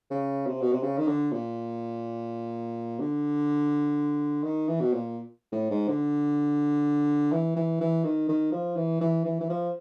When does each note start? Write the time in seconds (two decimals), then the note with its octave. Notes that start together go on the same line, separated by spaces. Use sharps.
0.11 C#3
0.47 C3
0.61 B2
0.72 C3
0.83 C#3
0.98 D#3
1.07 D3
1.32 A#2
3.00 D3
4.44 D#3
4.68 E3
4.80 B2
4.93 A#2
5.52 A2
5.70 G#2
5.88 D3
7.32 E3
7.56 E3
7.81 E3
8.04 D#3
8.29 D#3
8.52 F3
8.76 E3
9.01 E3
9.25 E3
9.40 E3
9.49 F3